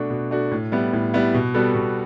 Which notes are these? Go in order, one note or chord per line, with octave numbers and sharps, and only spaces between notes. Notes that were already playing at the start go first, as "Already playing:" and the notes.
Already playing: B2 A3 D4 F#4
B2
A3 D4 F#4
A2
G3 B3 E4
A2
G3 B3 E4
B2
G3 B3 F#4 A4
B2